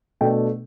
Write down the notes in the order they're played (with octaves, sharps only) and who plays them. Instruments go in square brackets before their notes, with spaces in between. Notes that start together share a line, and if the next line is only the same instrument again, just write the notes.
[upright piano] B2 A3 D4 G5